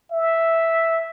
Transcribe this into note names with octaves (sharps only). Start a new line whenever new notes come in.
E5